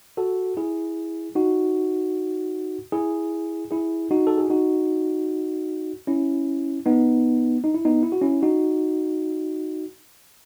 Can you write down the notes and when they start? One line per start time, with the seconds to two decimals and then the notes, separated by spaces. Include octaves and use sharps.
0.17 F#4 A4
0.57 E4 G#4
1.35 D#4 F#4
2.92 E4 G#4
3.71 E4 G#4
4.11 D#4 F#4
4.27 A4
4.38 G#4
4.50 D#4 F#4
6.07 C#4 E4
6.85 B3 D#4
7.64 D#4
7.74 E4
7.85 B3 D#4
8.03 E4
8.12 F#4
8.22 C#4 E4
8.43 D#4 F#4